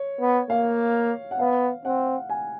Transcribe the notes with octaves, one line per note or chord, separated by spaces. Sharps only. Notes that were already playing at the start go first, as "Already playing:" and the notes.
Already playing: C#5
B3
A#3 F5
F#5
B3 F5
C4 F#5
G#5